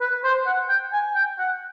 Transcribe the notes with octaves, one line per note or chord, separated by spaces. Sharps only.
B4
C5
F#5
G5
G#5
G5
F#5